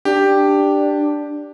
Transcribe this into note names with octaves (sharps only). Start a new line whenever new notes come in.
D4 G4